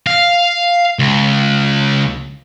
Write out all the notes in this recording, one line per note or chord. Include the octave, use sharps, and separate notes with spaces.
F5
C#2